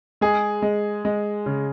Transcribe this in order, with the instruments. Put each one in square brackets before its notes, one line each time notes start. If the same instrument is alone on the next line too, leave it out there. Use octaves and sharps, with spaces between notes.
[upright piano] G#3 [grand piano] G#4
[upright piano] G#3
G#3
C#3